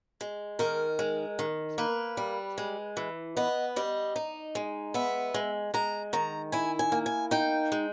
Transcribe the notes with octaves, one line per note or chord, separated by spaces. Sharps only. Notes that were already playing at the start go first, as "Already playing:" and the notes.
G#3
D#3 A#4
G#3
D#3
A#3 B4
G3
G#3
E3
B3 D#5
G3 D#5
D#4
G#3
B3 E5
G#3
G#3 A#5
D#3 A#5
E4 G#5
G#5
A#3
G#5
D#4 G5
G#3